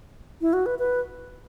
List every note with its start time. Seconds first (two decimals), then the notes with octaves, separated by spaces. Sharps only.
0.41 E4
0.53 F#4
0.66 B4
0.79 B4